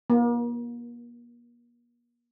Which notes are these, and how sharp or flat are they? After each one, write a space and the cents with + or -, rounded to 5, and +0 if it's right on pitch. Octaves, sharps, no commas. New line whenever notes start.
A#3 +40